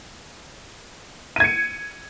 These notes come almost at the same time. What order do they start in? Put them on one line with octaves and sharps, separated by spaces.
D#7 G#6 C#7